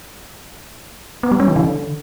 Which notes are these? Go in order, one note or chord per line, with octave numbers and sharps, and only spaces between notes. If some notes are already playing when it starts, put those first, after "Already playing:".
B3
G3
C#4
E3
D3